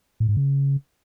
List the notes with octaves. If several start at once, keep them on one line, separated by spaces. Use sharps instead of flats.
A2
G#2
C#3